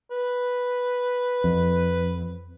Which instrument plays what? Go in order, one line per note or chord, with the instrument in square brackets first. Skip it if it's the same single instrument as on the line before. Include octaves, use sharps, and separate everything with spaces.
[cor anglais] B4
[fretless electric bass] F2